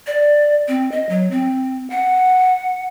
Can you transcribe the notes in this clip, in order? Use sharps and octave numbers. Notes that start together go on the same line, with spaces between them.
D5
C4
D#5
F#3
C4
F#5